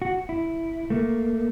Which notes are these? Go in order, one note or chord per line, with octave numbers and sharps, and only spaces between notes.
F#4
E4
A3 A#3